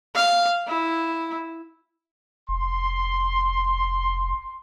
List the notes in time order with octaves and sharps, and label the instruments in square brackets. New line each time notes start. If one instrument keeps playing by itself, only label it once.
[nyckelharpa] F5
E4
[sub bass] F1 [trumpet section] C6